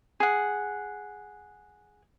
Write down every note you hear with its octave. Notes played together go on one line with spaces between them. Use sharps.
G#4 F#5